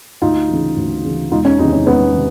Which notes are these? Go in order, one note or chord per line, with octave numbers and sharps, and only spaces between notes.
D2 D#4 F4
C#3 E3
D2
C#3 E3
E1 D#4 F4
C#4 D#4
E2 C3 D#3 C#4 D#4
C#4 D#4
E1 B3 C#4
C3 D#3